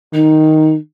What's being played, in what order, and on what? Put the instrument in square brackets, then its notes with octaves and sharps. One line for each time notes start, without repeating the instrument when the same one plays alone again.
[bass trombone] D#3 [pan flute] D#4